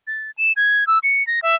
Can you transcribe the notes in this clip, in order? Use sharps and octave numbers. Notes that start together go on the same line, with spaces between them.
A6
E7
G#6
E6
C#7
A#6
E5